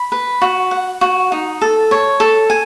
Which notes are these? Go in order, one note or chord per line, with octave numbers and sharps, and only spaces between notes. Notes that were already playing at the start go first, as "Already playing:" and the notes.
Already playing: B5
B4
F#4
F#5
F#4
D#4
A4
C#5
A4
G#5